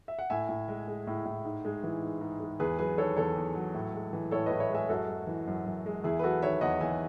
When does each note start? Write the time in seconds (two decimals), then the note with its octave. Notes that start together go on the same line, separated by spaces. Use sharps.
0.08 E5
0.19 F#5
0.30 A2 E5 G#5
0.49 A2
0.68 G#3
0.88 G#3
1.07 A2
1.25 A2
1.45 G#2
1.65 G#3
1.83 E3
2.03 G#2
2.21 G#2
2.40 G#3
2.60 E2 G#4 B4
2.79 F#3 G#4 B4
2.98 D#3 A4 C#5
3.17 E2 A4 C#5
3.36 E2
3.55 F#3
3.74 A2
3.94 G#3
4.13 E3
4.31 A2 A4 C#5
4.46 A2 B4 D#5
4.60 C#5 E5
4.71 G#3 E5 G#5
4.89 F#2 F#4 A4
5.08 G#3
5.27 E3
5.47 F#2
5.66 F#2
5.86 G#3
6.04 E2 E4 G#4
6.19 B4
6.23 F#3 F#4 A4
6.42 D#3 C#5 E5
6.61 E2 D#5 F#5
6.81 E2 E5 G#5